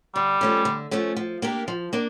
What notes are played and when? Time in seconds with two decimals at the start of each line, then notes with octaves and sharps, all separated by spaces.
0.15 D3 G3
0.41 F3 A3 C#4
0.65 D3
0.91 F3 A3 C#4
1.16 F3
1.42 A#3 D4 G4 A#4
1.68 F3
1.93 A#3 D4